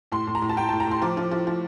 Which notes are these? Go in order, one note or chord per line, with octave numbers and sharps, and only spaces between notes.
A2 C6
A2
A#5
A2
A5
A2 G5
A2 A5
A#5
A2 C6
F3 D6
F3
F3
F3